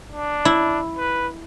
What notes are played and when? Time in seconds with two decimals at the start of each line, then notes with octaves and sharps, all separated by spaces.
0.12 D4
0.45 E4
0.97 B4